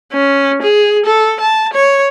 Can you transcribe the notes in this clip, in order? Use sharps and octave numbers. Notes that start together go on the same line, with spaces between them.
C#4
G#4
A4
A5
C#5